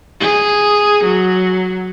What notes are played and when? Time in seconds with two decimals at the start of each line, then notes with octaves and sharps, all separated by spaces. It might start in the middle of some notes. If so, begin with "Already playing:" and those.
0.20 G#4
1.04 F#3